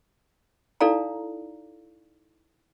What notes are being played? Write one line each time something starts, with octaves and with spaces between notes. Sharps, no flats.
D#4 E4 A4 D5 F5 A#5